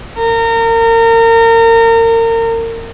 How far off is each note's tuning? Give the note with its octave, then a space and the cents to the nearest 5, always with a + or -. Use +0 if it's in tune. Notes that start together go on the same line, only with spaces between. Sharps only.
A#4 -30